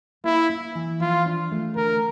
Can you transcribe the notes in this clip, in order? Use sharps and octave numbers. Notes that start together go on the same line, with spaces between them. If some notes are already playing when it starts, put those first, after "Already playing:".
A#3 E4
E4
E3
F3 F4
D4
A3
D3 A#4